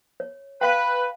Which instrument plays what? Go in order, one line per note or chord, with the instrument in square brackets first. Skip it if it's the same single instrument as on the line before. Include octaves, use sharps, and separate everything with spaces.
[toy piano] C#5
[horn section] B4 [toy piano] F5 G5